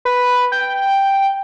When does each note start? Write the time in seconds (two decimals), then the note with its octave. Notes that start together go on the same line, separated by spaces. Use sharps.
0.05 B4
0.52 G5